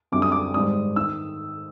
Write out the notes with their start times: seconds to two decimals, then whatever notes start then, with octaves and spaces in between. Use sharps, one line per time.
0.12 F#2 D3 G3 C4 D6
0.22 D#6
0.32 D6
0.54 G#2 D#3 G3 D#6
0.96 D#3 E6